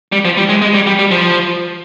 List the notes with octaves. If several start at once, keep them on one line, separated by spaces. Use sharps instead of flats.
G3
F3
G3
G#3
G#3
G3
G3
G3
F3